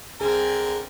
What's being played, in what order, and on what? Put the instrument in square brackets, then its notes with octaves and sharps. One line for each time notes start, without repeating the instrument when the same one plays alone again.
[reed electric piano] C2 G#4 [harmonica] D3 A#4 A#5 [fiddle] C4 G#5